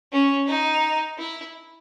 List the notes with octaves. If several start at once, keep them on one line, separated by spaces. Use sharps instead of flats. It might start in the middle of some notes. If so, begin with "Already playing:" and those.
C#4
D#4
E4